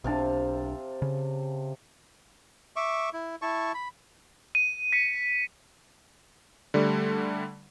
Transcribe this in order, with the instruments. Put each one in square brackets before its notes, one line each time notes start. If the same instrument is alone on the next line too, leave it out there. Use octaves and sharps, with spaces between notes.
[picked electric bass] B1 D4 [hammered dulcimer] C3 F5 A5
[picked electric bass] C#3
[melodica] E5 C#6 D6
E4
E4 A5 C#6
B5
[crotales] D#7
B6 C#7
[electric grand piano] D3 G3 A3